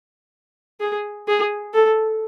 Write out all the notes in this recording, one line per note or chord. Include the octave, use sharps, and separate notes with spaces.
G#4
G#4
A4